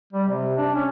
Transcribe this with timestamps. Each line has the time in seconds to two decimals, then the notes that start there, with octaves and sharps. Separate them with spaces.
0.13 G3
0.28 C3
0.58 D4
0.75 C#4